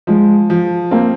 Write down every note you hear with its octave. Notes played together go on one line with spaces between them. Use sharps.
F3 G#3
F3
A#3 C4